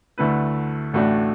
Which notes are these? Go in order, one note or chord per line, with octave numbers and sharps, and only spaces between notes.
D2 D3 A3 E4 B4
A1 A2 A3 D4 F#4